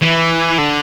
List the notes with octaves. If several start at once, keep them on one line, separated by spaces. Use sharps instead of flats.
E3
D3